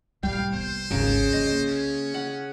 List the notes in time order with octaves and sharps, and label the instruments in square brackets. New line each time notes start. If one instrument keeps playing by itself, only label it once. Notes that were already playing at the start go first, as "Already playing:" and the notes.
[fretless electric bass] C2 G3 [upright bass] A2 [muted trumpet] F5 [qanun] G5
[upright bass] B3 [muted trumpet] C5
[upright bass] G#1 D2 [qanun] C#3 A#4
[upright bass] A#3 [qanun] D#5
[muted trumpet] C#4
[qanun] F#5